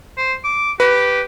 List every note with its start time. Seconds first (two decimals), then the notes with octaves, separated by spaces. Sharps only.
0.17 C5
0.44 D6
0.80 G4 B4